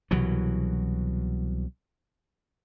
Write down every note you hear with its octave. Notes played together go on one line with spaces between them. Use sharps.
C2 B2 E3 F#3